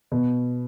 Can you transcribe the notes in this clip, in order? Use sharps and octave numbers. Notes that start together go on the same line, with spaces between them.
B2